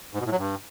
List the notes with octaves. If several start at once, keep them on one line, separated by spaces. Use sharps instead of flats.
G#2
B2
A2
F#3
G2